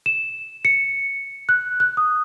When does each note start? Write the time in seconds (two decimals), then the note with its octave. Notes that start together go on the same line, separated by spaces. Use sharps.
0.06 E7
0.65 C#7
1.49 F#6
1.80 F#6
1.97 D#6